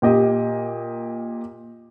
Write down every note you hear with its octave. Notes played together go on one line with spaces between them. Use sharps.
A#2 G4 D#5